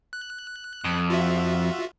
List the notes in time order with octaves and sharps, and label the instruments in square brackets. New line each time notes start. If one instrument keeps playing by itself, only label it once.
[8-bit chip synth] F#6
[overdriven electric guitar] F2
[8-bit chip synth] F4 F#4 E5